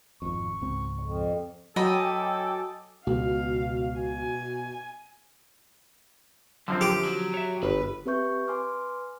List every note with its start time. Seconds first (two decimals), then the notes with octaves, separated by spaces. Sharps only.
0.22 G#1 F2 C#6
0.61 C#2 G#2 C4
0.99 F2
1.76 F#3 A4 D#5 G5 G#5 B5 D6
3.07 C#2 B2 F5
4.00 G#5
6.68 F#2 D3 F3 C4
6.81 G4
7.05 F#3
7.34 C#5 E5
7.63 G1 B4
8.06 C4 G4 B4 E5 C#6 G6
8.48 B4 G#5 C6 D6 F6